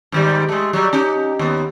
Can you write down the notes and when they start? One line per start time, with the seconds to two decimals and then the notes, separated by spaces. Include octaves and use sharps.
0.12 G#2 D#3 G3
0.49 G#3 A3
0.73 F#3 G3
0.93 C#4 D#4 G4
1.39 D#2 B3